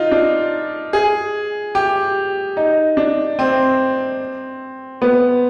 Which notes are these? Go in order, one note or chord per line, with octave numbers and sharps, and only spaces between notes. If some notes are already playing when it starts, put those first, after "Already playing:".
Already playing: D#4 F4
D4
G#4
G4
D#4
D4
C4
B3